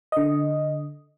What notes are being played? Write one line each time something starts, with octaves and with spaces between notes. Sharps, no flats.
D3 D#5